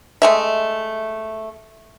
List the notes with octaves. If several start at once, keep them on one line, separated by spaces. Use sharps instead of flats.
G#3 A3 E5